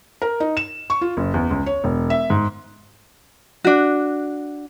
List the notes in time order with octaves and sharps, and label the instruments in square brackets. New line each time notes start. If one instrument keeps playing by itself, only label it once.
[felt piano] A#4
D#4
E7
C#6
F4
F#1
E2
C#2
C#5
E1
E5
G#2
[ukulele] D4 F#4